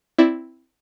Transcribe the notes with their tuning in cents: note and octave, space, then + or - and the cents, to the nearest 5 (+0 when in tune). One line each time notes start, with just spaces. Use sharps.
C4 +0 E4 +0 D5 +0